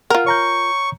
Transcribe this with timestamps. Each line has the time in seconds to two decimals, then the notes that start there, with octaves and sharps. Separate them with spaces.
0.10 F4 A#4 F#5
0.26 C#5 A#5 C#6 G6